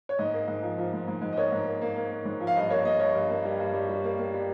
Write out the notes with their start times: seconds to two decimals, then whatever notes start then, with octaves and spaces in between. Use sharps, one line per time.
0.09 C#5
0.19 G#2 D#5
0.33 A#3
0.48 G#2
0.63 F3
0.78 F3
0.93 G#2
1.08 G#2
1.22 G#2
1.33 D#5
1.36 A#3 C#5
1.52 G#2
1.67 A#3
1.82 A#3
1.96 A#3
2.11 A#3
2.25 G#2
2.41 F3
2.47 F5
2.55 G2 D#5
2.70 A#3 C#5
2.85 A#3 D#5
3.00 G2 C#5
3.15 G2
3.30 A#3
3.45 G3
3.60 G2
3.73 G3
3.89 G3
4.04 A#3
4.19 A#3
4.34 G3